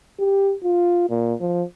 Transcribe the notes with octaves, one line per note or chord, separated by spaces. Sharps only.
G4
F4
A#2
F3